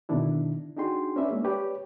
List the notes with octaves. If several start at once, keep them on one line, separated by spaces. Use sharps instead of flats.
B2 D3 D#3 D4 E4
D4 D#4 F#4 G#4 G5 C6
C#4 D4 B4 D5 E5
G#3 A#3 G#4
G4 B4 C#5 D5